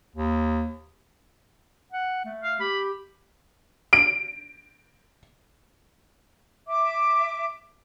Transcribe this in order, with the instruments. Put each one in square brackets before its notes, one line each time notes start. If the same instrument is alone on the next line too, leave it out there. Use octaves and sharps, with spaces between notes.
[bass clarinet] D#2
[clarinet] F#5
A3
[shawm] F5
[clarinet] G4 [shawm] B5
[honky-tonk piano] D7
[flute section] E5 D6